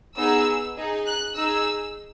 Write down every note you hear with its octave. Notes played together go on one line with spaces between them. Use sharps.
B3 D#4 G#4 E6
D#4 G#4
F#6
D#4 G#4 E6